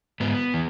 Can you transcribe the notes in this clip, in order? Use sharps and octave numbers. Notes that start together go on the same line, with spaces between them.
G#2 B3
E3